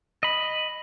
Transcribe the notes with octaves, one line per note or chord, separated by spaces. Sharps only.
D#5 B5